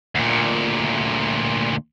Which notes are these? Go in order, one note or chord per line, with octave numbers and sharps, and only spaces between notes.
D2 A#2